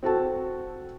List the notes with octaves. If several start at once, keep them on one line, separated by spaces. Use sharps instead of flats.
C4 F#4 A4 A5